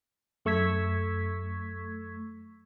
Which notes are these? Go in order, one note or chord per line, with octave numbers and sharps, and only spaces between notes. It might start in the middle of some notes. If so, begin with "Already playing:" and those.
F#2 A3 C#6 E6 G#6 B6